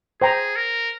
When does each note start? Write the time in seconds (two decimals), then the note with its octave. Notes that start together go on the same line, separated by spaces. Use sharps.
0.22 G#4 C5 G5 A#5
0.56 A#4